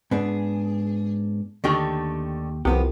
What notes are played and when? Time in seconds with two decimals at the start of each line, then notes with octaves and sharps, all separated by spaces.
0.11 G#2 B3 D4 G#4
1.64 D#2 D3 D#3 A3 G4
2.65 C2 F3 B3 G4